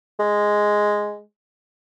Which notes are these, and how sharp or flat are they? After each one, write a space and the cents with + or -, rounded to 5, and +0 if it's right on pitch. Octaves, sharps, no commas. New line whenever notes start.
G#3 +0